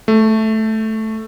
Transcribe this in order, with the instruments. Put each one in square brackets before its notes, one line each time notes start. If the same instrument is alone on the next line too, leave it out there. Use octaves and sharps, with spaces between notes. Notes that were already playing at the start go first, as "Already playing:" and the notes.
[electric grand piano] A3